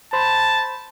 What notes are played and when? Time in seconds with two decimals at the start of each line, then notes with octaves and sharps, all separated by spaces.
0.13 C5 A5 B5 C6